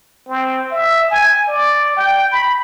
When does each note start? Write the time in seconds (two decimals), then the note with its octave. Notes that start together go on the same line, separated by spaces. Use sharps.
0.28 C4
0.71 E5
1.11 G#5
1.48 D5
1.97 G5
2.31 B5